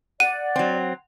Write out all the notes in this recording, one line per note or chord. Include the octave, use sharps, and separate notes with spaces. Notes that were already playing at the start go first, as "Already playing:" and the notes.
D5 F#5 D#7
F#3 C4